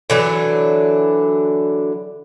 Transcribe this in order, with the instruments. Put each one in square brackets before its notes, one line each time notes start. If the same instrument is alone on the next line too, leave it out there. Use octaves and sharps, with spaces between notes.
[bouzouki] D3 E3 F#3 D4